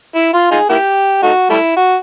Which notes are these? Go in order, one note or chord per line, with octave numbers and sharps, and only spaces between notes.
E4
F4
D#4 F4 G#4
A#3 E4 G4
A3 D#4 F#4
G3 A3 E4
F#4